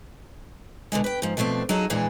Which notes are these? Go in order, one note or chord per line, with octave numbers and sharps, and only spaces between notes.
B2 D3 D#3 G#3
B4 G5
G#2 F3
B2 F3 A3 C4 D4
F#3 C#4 D#4 F4 G#4 A4
E2 A#2 E3 F3 G#3 D4